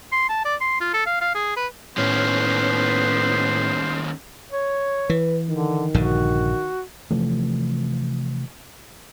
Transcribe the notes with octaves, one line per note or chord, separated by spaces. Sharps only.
C6
A5
D5
C6
F4
A4
F5
F5
G#4
B4
D#2 A2 B3 C#4 C5
C#5
E3 B4
D3 D#3
A#1 G2 D3 F#4
C3 E3 F3 A3